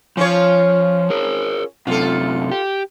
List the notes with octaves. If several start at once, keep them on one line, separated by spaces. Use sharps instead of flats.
F3 C#4 F4 C#5
G#4 A#4
F#2 C3 F4 A4
G4